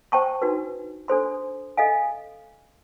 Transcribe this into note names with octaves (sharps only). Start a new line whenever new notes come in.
C5 G5 A5 C#6
D4 D#4 F#4 B4
D4 A4 C5 C6
A4 D#5 F5 G#5